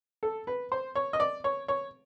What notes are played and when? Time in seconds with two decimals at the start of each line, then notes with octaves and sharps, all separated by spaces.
0.23 A4
0.47 B4
0.72 C5
0.95 C#5
1.13 D#5
1.20 D5
1.44 C#5
1.68 C#5